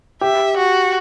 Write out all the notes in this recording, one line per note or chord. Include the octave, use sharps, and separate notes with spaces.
G4 E5
F#4